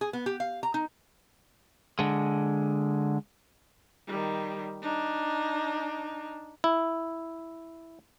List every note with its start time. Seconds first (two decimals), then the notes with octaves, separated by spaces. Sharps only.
0.01 G#4
0.13 B3
0.26 G4
0.40 F5
0.63 A#5
0.74 D#4
1.99 D3 G#3
4.08 D#3 G3
4.82 D4 D#4
6.64 E4